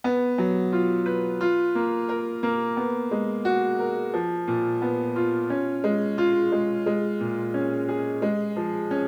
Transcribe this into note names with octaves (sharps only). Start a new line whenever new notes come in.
B3
F#3
F4
B4
F4
A#3
A#4
A#3
B3
G#3
F#4
A#4
F3
A#2
B3
F4
C#4
G#3
F4
G#3
G#3
A#2
C#4
G#4
G#3
F3
C#4